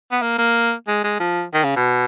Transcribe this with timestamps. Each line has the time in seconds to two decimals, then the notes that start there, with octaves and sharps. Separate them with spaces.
0.11 B3
0.22 A#3
0.38 A#3
0.88 G#3
1.04 G#3
1.20 F3
1.54 D#3
1.64 C#3
1.76 B2